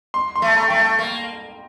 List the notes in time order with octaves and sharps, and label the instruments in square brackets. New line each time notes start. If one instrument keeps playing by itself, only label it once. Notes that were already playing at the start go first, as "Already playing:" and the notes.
[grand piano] C6
C6
[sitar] A3
[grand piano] A5
A#5
[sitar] A3 [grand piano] G5
[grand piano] A5
[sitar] A#3